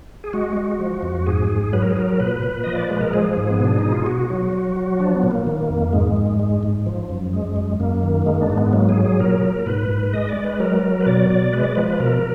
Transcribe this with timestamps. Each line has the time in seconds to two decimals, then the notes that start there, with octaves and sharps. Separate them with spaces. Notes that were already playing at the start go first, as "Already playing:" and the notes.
0.24 G#4
0.33 G#3 F#4
0.57 G#3
0.79 F3
1.02 F2
1.26 G#2 G#4
1.50 G#2
1.73 F#3 B4
1.82 A#4
1.91 G#4
1.97 F#3 A#4
2.20 A#2 B4
2.43 A#2
2.64 F3 D#5
2.76 D5
2.89 G#3 B4
3.01 A#4
3.13 F3 G#4
3.37 G#2
3.50 B3
3.60 B2 D4
3.79 B2 D#4
3.92 F4
4.06 B2 F#4
4.30 F#3
4.53 F#3
4.76 F#3
5.00 F3 D4
5.15 B3
5.23 A#2
5.31 A#3
5.47 D#3
5.70 F2
5.93 G#2 G#3
6.16 G#2
6.39 G#3
6.63 G#2
6.86 F3
7.10 F#2
7.33 G#3
7.56 F#2
7.80 F#2 A#3
8.03 D#3
8.26 G#3 A#3
8.42 D4
8.50 G#2
8.58 B3
8.73 F#3 A#3
8.89 G#4
8.96 F#3
9.05 G#4
9.19 A#2 A#4
9.43 A#2
9.66 G#2 B4
9.89 G#2
10.13 G#3 D#5
10.29 D5
10.37 G#3
10.44 B4
10.60 F#3 A#4
10.83 F#3
11.01 B4
11.06 B2 D5
11.30 B2 D5
11.53 G#3 B4
11.64 D5
11.75 F3 B4
11.90 B4
12.00 B2 A#4